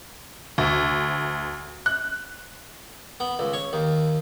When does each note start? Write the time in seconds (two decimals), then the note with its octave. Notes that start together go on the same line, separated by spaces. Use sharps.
0.58 D2
1.86 F#6
3.20 B3
3.39 C#2
3.53 C#5
3.73 D#2